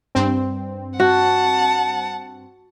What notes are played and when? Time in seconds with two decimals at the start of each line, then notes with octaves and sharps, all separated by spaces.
0.15 G2 C4
1.00 F#4 F#5 A5